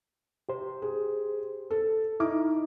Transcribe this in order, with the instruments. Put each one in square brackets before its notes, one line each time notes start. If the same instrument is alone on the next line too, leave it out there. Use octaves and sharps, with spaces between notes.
[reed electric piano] G4 C5
[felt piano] G#4
A4
[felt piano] D#4 D6 [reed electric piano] E4